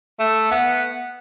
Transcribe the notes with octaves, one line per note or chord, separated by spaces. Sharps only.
A3
B3